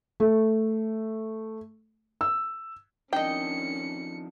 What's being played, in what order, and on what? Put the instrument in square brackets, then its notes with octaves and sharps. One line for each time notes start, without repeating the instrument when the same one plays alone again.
[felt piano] A3
E6
[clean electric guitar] F2 D#3 D4 [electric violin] C#4 C#7 [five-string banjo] D#5 G5